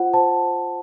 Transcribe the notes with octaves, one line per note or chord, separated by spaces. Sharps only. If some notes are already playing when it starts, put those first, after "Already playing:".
Already playing: F4 C5 F#5
C5 A5
C5